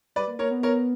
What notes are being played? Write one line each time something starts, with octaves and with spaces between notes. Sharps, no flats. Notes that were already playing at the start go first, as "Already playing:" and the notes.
G3 B4 D5
A#3
A#3 A#4 C#5
B3
A#4 C#5